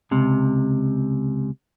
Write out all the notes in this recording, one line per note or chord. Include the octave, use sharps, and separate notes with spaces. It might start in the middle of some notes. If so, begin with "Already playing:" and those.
C#2 C3